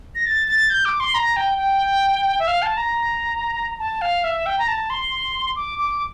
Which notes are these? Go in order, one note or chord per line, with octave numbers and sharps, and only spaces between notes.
A#6
A6
A6
G6
D6
C6
A#5
G5
G5
E5
F5
A5
A#5
A5
F5
E5
G5
A#5
A5
C6
D6
D6